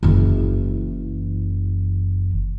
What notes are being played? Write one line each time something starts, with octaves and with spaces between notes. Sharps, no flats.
F#1 E3